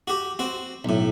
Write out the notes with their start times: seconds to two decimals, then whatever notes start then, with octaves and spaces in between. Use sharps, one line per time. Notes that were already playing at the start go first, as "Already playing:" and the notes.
0.08 F#4 G4
0.39 C4 F#4
0.85 B1 A2